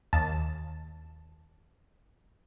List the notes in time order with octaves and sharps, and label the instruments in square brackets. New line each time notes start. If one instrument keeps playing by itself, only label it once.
[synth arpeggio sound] D#2 A5